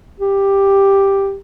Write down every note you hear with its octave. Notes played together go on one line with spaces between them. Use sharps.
G4